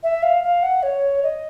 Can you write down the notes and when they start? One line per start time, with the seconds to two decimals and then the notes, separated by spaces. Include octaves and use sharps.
0.03 E5
0.23 F5
0.43 F5
0.63 F#5
0.83 C#5
1.23 D#5